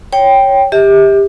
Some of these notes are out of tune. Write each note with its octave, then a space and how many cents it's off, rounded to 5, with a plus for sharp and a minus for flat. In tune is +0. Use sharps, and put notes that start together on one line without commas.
C#5 +0 G5 +0
G4 +20 E5 -40